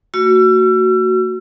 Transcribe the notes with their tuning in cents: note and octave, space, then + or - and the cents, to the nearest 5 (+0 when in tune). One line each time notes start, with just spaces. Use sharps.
A#3 -45 F#4 +5 E6 +40